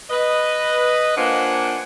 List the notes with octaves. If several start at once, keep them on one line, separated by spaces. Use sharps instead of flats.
B4 D#5
A#3 D4 F4 C5 F#5 G#5